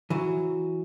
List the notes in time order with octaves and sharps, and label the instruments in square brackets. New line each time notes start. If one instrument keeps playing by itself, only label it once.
[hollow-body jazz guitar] E3 F#3